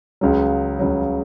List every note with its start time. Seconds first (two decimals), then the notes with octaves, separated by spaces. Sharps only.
0.21 C#2 C#3 F#3
0.79 C#2 C#3 F#3